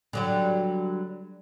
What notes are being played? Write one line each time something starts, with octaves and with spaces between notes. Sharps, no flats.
D3 F#3 G3